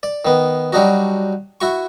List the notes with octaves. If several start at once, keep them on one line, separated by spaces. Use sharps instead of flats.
D5
D#3 B3
F#3 G3 D4 D#4 F#4
E4 F#4 C#6